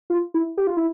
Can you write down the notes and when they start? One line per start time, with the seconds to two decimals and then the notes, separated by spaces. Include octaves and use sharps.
0.10 F4
0.34 E4
0.58 G4
0.67 F4
0.77 E4